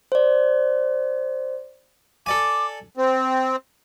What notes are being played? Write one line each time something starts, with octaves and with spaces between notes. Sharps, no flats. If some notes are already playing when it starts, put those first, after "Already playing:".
C5 D5
A4 D5 G#5 D6
C4